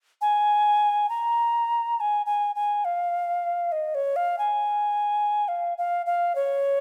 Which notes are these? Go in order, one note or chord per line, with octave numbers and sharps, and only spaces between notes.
G#5
A#5
A#5
G#5
G#5
G#5
F5
D#5
C#5
F5
G#5
F5
F5
F5
C#5